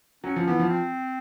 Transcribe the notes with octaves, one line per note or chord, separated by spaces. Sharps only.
F#3 C#4
F3
E3 B3
F3
C4